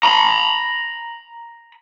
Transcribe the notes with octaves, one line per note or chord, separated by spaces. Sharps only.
A#5 B5